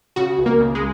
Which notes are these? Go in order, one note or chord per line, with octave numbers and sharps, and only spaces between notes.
C#3 F#4
C#2
A#3
C#3
G#3